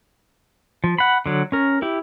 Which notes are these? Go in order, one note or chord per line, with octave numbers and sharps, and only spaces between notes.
F3
F#5 B5
D3 F#3
C#4 A#4
E4 G4